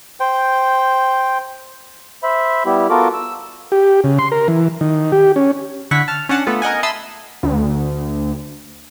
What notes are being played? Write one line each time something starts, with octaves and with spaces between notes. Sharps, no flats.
C5 G5
C5 E5 B5
G3 B3 E4 G4
B3 F4 F#4 A4 A#4 D6
E6
G4
C#3
C6
A#4
E3
D#3
G4
C#4
D3 E4 F#5 C#6 B6
A5 F6
C#4 D4 F#5 A5
A3 B3 F4 A4
A#4 D#5 F#5 G#5
E5 A5 B5 C6 D#6 E6
D2